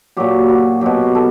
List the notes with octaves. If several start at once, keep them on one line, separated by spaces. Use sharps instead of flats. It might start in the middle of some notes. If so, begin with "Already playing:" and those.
A#2 F#3 G4
F#4
B2 F#3 G4
A4